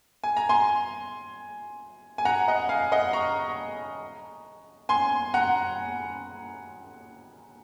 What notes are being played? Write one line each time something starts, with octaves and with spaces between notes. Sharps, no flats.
G#5
A#5
G#5 C6
G#5
F#5 A#5
D#5 F#5
F5 G#5
D#5 F#5
A#5 C#6
G#5 C6
F#5 A#5